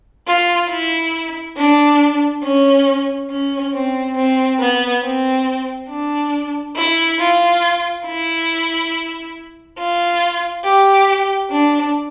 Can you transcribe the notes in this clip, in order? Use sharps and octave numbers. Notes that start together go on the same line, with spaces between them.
F4
E4
D4
C#4
C#4
C4
C4
B3
C4
D4
E4
F4
E4
F4
G4
D4